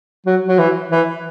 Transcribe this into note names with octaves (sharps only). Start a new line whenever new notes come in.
F#3
F#3
E3
E3